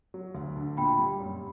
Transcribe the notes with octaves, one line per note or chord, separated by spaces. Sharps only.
F#3
D2
D3
A#2 G5 B5
G3
F#2